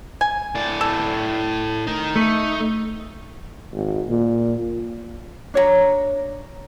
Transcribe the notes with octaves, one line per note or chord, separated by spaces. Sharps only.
G#5
A2 D5
A4
D#4 A#4
A3 D#4
G#1
A#2
D4 C#5 D5 A#5